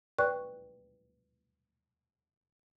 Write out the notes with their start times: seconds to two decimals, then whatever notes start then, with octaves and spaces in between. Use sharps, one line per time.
0.19 B4 D5 G5 C#6 F#6